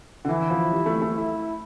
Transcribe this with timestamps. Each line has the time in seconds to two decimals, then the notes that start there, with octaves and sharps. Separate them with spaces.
0.25 D3
0.28 E3 E4
0.50 F3
0.72 G3
0.86 A3
1.02 A3
1.15 E4